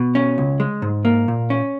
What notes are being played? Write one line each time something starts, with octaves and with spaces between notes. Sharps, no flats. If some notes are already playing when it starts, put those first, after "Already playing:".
Already playing: B2
C#4
C#2
G#3
G#2
A#3
A#2
C#4